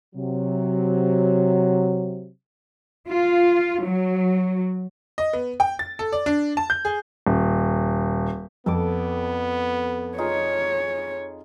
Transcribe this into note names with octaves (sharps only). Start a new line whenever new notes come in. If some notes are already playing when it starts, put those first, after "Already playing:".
C3 F#3
F4
F#3
D#5
B3
G5
A6
A4
D5
D4
A5
G6
G#4
D#1
F2 B3 A4 A5 D6
D#4 F4 G#4 C#5